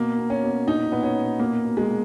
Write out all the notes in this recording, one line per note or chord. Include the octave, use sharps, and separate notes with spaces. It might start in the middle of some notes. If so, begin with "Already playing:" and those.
Already playing: B2 A#3
B2
C#4
B2
A#2 D#4
A#2 B3
C#4
A#2
B2 A#3
B2
G#3
B2